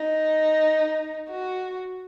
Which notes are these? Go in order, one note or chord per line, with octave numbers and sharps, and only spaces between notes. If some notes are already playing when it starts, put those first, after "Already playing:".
Already playing: D#4
F#4